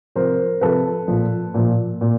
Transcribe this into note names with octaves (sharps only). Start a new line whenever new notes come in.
C3 F3 A#4 C5
C3 F3 A4 B4
A#2 F3
A#2 F3
A#2